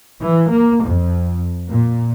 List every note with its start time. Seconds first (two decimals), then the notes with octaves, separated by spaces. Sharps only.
0.21 E3
0.51 A#3
0.84 F2
1.69 A#2